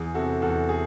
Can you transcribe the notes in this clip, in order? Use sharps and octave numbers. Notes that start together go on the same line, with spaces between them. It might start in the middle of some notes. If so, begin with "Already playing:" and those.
Already playing: E2 G#4
C3 F#4 A4
E2 F#4 A4
G#4